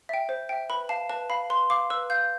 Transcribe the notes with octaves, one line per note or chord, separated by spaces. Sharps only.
E5 G5
C5
E5 G5
B4 B5
F5 A5
B4 A5
F5 B5
B4 C6
F5 D6
B4 E6
F5 G6